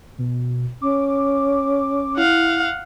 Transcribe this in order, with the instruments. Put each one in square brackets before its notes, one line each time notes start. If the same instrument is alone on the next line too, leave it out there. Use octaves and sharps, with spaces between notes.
[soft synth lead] B2
[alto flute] C#4 [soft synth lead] D6
[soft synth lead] E4 [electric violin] F5 F#5